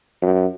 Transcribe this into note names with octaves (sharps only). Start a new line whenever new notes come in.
F#2